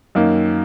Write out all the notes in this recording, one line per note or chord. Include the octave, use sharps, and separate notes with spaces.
F#2 D#3 A#3